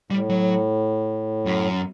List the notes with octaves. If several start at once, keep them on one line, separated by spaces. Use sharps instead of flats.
A2 G3
F#3
F#2